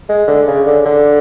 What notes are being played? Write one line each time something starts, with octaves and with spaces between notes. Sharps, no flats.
G#3
D3
C#3
D3
D3